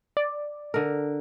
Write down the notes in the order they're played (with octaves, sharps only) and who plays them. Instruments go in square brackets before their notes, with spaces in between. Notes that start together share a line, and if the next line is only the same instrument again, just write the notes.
[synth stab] D5
[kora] D3 A#4